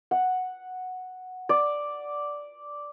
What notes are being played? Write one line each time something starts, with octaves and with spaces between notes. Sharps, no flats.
F#5
D5